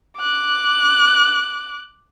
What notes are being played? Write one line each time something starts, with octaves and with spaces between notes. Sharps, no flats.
D6 F#6